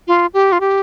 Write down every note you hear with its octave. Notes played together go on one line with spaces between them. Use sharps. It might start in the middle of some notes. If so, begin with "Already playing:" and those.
F4
G4
F4
G4